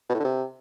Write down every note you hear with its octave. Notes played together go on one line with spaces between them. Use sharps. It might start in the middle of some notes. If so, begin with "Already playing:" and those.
B2
A2
D3
C3